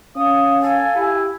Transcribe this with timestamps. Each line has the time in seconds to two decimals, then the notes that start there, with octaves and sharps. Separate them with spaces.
0.16 C#4 F5 D#6
0.62 A4 G#5
0.95 E4 G4